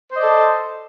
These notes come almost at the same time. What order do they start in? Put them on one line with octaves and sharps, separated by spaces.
C5 D#5 D5 A4